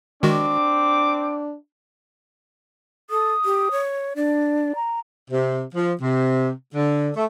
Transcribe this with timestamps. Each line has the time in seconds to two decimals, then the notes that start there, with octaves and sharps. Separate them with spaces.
0.23 D#3 G#3 C4 D4 F#4 D6
3.10 A4 D#6
3.45 G4
3.71 C#5
4.16 D4 D5
4.75 A#5
5.31 C3
5.74 F3
6.01 C3
6.75 D3
7.16 A3